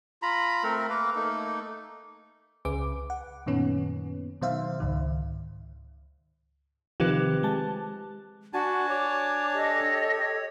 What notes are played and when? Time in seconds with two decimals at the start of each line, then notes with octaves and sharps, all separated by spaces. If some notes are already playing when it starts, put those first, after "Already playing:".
0.22 F4 A#5 B5
0.63 A3 C4 A#4
0.89 A#3 B4 F5
1.15 A3 A#3 D#4
2.65 C#2 C#3 G#4 B4 D6
3.10 F#5
3.46 F#2 A#2 D#3 B3 C#4
4.41 B2 D#3 F#3 C5 E5 F5
4.80 C#2 G#2 D#3
7.00 C3 D#3 F3 C4 G4 B4
7.43 G#3 A5
8.53 D4 F#4 F#5 G#5 A5
8.89 C#5 D6
9.53 G4 A4 D#5